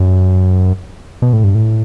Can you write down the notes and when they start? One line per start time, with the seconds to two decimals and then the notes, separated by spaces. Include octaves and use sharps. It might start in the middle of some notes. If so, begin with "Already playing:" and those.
Already playing: F#2
1.22 B2
1.33 A2
1.44 G2
1.55 A2